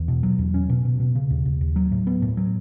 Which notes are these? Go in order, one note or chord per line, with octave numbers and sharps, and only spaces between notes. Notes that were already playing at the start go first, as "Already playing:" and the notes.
Already playing: E2
B2
F#3
E2
C#4
B2
B2
B2
C#3
D#2
D#2
D#2
F#3
A2
B3
A2
F#3